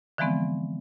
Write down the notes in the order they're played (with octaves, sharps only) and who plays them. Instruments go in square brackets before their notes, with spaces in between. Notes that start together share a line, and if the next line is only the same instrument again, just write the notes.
[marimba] D3 E3 F3 G#3 B3 C4